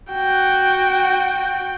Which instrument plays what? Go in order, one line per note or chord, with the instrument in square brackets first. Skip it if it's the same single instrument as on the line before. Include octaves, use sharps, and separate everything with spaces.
[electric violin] F#4 G5